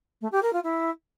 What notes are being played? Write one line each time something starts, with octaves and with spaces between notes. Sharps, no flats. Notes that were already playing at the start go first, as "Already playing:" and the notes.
A3
G4
A#4
F4
E4